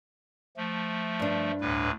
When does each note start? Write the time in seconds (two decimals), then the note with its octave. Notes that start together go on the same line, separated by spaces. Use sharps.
0.57 F3 A3
1.20 G2 D4
1.61 D2 A2 B4